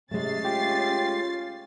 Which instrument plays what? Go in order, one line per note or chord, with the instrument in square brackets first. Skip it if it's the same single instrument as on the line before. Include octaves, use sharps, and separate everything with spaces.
[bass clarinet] C3 [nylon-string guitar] G#3 A3 [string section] C#4 A6 C7
[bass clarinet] F4 [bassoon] G4